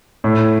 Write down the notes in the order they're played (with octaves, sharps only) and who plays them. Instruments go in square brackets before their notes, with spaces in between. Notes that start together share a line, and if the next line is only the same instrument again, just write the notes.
[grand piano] A2